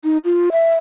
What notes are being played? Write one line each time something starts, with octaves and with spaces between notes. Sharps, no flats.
D#4
F4
E5